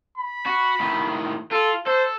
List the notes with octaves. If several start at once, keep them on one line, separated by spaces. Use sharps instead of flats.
B5
F#4
A2 D#3
F4 A4
A4 C5